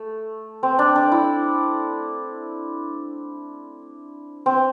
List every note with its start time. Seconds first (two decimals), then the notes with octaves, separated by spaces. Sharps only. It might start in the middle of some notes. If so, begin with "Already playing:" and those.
Already playing: A3
0.63 C4
0.79 D4
0.96 D4
1.12 E4
4.46 C4